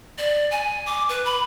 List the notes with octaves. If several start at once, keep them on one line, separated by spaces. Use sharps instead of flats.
D5
G#5
D6
B4
B5